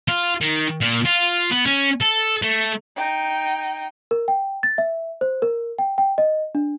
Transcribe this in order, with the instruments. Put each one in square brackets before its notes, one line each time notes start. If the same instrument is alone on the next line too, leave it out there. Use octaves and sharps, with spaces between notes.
[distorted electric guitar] F4
D#3
A#2
F4
B3
C#4
A4
A3
[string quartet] D#4 G5
[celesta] A#4
G5
A6
E5
C5
A#4
G5
G5
D#5
D4